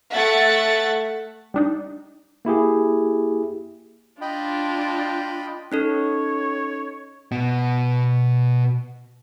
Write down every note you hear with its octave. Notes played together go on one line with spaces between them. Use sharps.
A3 E5 F#5 A6
G3 D4 D#4
A#3 E4 G4 G#4
D4 F4 D#5 G5 B5
C#4 D#4 A4 C#5
B2 B3